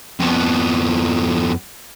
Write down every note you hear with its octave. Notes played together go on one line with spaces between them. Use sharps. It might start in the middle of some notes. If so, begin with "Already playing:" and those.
F2 B3